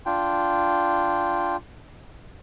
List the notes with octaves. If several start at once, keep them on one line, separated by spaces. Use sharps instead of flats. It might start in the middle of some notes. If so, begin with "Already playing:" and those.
D4 F4 G5